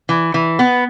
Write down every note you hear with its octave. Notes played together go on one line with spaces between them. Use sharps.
E3
E3
B3